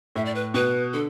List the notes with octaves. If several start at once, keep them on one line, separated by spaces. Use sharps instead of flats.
A2 E5
D5
B4
B2 B4
D3 A4